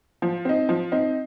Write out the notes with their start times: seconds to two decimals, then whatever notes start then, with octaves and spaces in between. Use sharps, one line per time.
0.22 F3
0.45 C4 D#4
0.69 F3
0.92 C4 D#4